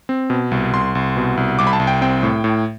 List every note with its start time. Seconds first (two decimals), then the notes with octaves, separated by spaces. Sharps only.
0.09 C4
0.30 B2
0.51 C2
0.73 C2 C6
0.95 C2
1.16 B2
1.37 C2
1.59 C2 D6
1.67 B5
1.73 A5
1.80 C2
1.87 G5
2.02 C4 G5
2.23 A2
2.44 A2